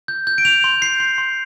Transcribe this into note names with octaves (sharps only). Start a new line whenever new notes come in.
G6
G6
D7
G6 F7
C6
G6 C7
C6
C6